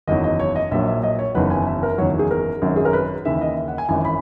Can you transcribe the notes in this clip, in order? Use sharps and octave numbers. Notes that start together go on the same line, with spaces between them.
F#1 E2 D#3 F#3 D#5
D#5
C#5
D#5
A#1 A#2 F#3 E5
E5
D#5
C#5
F#1 E2 D#3 F#3 B4
G#5
E5
A#4
F#1 E2 D#3 F#3 C#5
G#4
A#4
G#1 F#2 D#3 F#3
G#4
A#4
B4
D#2 C#3 E3 E5
E5
D#5
E5
F#5
G#5
G#1 F#2 E3 G#5
B5